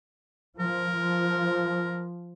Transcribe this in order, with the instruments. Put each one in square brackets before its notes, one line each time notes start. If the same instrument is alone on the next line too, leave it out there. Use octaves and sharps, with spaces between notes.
[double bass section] F3 [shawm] A#4
[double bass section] F3